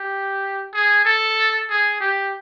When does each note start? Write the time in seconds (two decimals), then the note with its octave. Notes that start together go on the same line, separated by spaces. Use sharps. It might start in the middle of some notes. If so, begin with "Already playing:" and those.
Already playing: G4
0.74 G#4
1.05 A4
1.69 G#4
2.00 G4